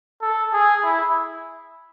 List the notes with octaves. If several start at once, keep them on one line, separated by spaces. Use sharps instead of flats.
A4
G#4
E4